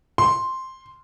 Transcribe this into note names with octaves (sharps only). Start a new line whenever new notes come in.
C6